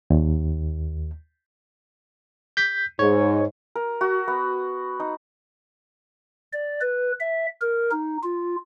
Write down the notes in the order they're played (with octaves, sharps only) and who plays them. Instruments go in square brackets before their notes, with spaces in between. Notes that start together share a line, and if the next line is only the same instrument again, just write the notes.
[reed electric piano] D#2
[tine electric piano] G6 B6
[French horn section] G#2 [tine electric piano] C#5
[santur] A#4
F#4
B3
D#4
[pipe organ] D5
B4
E5
A#4
D#4
F4